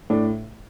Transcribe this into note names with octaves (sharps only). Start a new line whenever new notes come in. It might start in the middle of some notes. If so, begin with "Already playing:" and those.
A2 D4